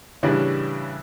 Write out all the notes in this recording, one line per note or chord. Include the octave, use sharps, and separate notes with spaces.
A2 C#3 E3 G3 C#4 D4